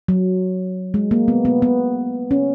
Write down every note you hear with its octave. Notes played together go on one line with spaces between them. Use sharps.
F#3
G#3
A#3
B3
B3
B3
C#4